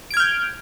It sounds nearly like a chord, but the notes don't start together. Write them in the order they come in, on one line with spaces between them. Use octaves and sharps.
D7 G#6 F6 G6